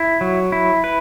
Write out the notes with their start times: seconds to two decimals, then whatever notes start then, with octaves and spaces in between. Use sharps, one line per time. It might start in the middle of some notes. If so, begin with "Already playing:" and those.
Already playing: E4
0.21 F#3
0.52 E4
0.84 B4